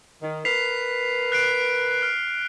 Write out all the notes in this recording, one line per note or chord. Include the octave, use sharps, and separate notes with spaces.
D#3
A#4 B4 B6 C7 F7
F#6 C7 D7
F6